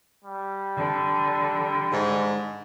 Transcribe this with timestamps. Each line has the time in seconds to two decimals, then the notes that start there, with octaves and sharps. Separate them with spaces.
0.24 G3
0.78 D3
1.92 G#2